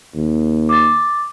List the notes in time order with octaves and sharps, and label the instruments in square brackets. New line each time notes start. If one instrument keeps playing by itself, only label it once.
[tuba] D#2
[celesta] D6 A6